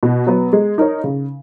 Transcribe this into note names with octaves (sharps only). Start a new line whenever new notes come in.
B2
F#3 B3
G#3
D#4 A#4 C#5
C#3